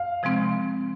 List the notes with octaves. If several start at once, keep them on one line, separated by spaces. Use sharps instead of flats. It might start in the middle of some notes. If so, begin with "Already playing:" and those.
Already playing: F5
C3 F3 G#3 C4